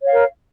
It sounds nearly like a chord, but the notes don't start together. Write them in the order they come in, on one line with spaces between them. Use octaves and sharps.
C#5 F5 A#4